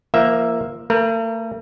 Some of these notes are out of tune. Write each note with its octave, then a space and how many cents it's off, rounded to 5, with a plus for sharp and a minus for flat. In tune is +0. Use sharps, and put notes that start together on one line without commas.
F3 -30 A#3 +0 E5 +0
A3 +45 A#4 +30